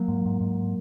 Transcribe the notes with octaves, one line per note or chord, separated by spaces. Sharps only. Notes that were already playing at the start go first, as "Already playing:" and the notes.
Already playing: F#3 A#3
G#2
G#2
G#2